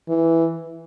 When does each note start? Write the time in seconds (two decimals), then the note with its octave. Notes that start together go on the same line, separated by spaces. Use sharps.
0.09 E3